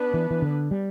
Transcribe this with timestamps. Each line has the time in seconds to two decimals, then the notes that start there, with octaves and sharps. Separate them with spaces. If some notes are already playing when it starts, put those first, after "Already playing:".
Already playing: B3 D4 B4
0.14 E3
0.31 E3
0.42 D3
0.71 G3